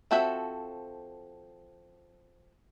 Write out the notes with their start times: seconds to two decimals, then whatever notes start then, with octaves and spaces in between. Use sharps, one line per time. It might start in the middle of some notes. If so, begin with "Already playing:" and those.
0.11 F3 C4 F#4 A4 E5